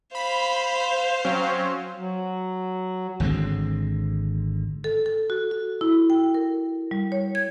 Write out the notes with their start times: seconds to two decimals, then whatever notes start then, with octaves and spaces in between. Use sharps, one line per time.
0.15 C5 F5 B5
1.25 F#3 C4 C#4
1.97 F#3
3.20 G#1 D3 G#3 C4
4.84 A4
5.06 A4
5.30 F#4
5.51 F#4
5.81 E4
6.10 G5
6.34 A#4
6.91 G3
7.12 C#5
7.35 G#6